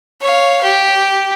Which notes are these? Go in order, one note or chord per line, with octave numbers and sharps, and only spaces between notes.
C#5 F5
G4